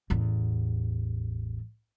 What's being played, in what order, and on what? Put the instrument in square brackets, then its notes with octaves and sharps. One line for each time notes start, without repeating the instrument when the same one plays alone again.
[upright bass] A1 E2